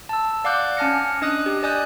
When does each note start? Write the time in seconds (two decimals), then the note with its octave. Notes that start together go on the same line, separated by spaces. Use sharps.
0.09 A5 E6
0.44 D5 F5 F#5 D6 F#6 G6
0.77 C#4 G#5 A5 F6 A#6 C#7
1.22 D4 D#5 D#6 F#6
1.46 G4
1.63 D5 D#5 G#5 D#6 F#6 G6